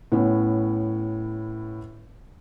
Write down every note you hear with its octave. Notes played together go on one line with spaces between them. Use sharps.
A2 B3 C#4